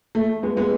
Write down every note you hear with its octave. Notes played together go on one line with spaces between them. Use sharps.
A3
G#3 B3
G#3 B3